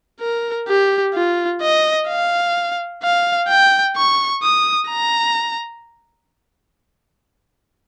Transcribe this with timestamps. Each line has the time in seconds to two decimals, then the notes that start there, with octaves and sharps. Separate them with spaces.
0.21 A#4
0.68 G4
1.14 F4
1.62 D#5
2.09 F5
3.03 F5
3.48 G5
3.96 C#6
4.43 D#6
4.89 A#5